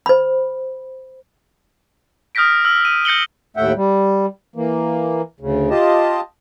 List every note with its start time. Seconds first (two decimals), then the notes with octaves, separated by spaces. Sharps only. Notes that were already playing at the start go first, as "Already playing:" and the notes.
0.06 C5 B5
2.35 D#6 F6 G6 A#6 B6 D7
2.65 E6 F6
2.85 D#7
3.05 G6 A#6 C#7 F#7 G7
3.57 D#2 A2 A3 E5 F#5 G5
3.76 G3
4.56 E3 A#3
5.40 D2 C#3
5.70 F4 G4 D#5 A5